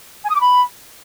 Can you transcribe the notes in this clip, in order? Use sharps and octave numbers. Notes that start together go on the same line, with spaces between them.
G#5
D#6
D6
B5